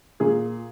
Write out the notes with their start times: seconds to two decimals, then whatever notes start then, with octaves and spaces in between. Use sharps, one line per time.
0.20 A#2 G#4